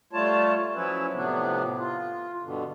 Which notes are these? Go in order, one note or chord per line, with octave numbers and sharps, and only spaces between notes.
G3 A3 F4 C#5 A5
F3 F#3 C#4 E4 B4
A2 C3 F3 B3 D4
F4
G2 B2 D3